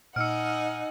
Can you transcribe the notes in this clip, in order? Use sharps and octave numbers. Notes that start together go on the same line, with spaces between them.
A#2 D#4 F#5 G#5 E6 F6